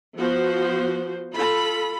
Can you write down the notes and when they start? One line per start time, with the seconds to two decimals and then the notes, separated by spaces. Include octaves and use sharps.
0.17 F3 B3 F#4 C5
1.33 F4 A4 B5